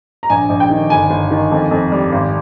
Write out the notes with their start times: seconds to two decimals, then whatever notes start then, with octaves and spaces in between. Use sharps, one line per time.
0.23 A#5
0.30 A#1 G#5
0.49 A#1
0.60 G5
0.70 D#3
0.90 G1 G#5
1.10 G1
1.31 D#3
1.51 F2
1.71 F2
1.92 G3
2.12 G#1